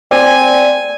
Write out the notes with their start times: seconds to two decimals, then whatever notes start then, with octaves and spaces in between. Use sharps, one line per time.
0.11 C4 D5 G#5